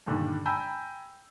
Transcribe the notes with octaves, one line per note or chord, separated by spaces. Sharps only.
G2 A#2 D3 D#3 D4
G5 G#5 A#5 B5 E6 G6